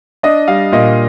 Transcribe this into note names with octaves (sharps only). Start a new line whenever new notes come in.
D4 D#5
G3 F5
A#2 D#5